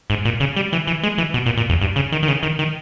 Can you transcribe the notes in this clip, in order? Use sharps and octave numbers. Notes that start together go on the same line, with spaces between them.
G#2
A#2
C#3
G3
E3
E3
G#3
E3
B2
A#2
A#2
E2
G2
C#3
D#3
D#3
C#3
D#3
D#3